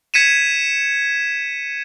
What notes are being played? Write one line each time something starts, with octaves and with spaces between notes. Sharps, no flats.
G#6 B6 C#7 D#7 E7